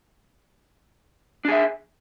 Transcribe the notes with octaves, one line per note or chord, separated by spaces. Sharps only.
D4 G#4 E5